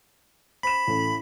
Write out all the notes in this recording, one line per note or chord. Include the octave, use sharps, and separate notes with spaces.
C5 B5 E7
A1 A4